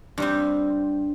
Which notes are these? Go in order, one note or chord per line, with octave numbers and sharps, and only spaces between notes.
G2 G3 C4